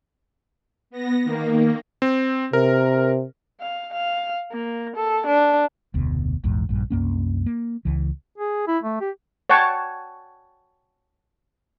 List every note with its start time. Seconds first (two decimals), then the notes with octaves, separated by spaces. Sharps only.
0.90 B3 A#6
1.24 D#3 A#3
2.02 C4
2.53 C3 A#4
3.61 F5
3.93 F5
4.52 A#3
4.96 A4
5.26 D4
5.94 F1 D2 B2
6.44 A#1 E2 G#2
6.69 A#1 G2
6.90 C2 F#2 A#3 C#4
7.46 A#3
7.85 C#2 E3
8.38 G#4
8.67 E4
8.83 A3
9.01 G4
9.50 C#5 F#5 G5 A5 C#6